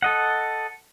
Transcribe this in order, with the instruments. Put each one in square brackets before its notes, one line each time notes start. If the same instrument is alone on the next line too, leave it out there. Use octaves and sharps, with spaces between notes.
[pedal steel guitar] A4 D#5 F#5